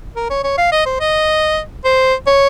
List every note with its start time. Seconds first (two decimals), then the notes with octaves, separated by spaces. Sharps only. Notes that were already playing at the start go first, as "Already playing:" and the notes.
0.16 A#4
0.30 C#5
0.44 C#5
0.58 F5
0.72 D#5
0.86 C5
1.00 D#5
1.85 C5
2.27 C#5